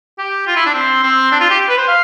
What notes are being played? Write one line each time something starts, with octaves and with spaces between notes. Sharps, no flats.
G4
F4
E4
D4
C4
C4
D4
F4
G4
B4
C5
F5